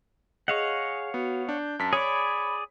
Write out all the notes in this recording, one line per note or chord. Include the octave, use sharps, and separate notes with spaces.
G#4 C#5 D#5 F5 F#5
B3 F#4
D4 G6
F#2 A5 B6
G#4 C#5 D5 B5